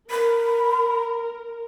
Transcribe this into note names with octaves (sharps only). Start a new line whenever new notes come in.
A#4 B5